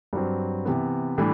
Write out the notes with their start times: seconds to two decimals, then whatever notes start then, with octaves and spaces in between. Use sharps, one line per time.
0.13 G2 F#3 C4
0.65 C3 E3 B3
1.18 A2 E3 G3 D4